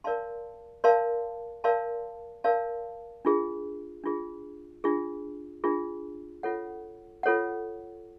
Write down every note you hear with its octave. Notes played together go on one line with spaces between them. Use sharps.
A#4 D5 F5 A5 C6
A#4 D5 F5 A5 C6
A#4 D5 F5 A5 C6
A#4 D5 F5 A5 C6
D4 F4 G#4
D4 F4 G#4
D4 F4 G#4
D4 F4 G#4
F4 A4 C#5 F#5
F4 A4 C#5 F#5